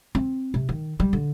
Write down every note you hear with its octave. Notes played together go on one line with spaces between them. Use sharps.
C4
C3
D#3
G3
D3